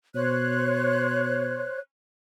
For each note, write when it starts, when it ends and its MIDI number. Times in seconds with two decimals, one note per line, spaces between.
0.15 1.65 47
0.15 1.79 72
0.15 1.79 73
0.15 1.79 90